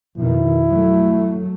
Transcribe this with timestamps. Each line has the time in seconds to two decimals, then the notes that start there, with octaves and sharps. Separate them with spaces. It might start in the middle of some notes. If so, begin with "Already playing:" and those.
0.18 F2 B2 D#3 E4
0.71 F#3 A3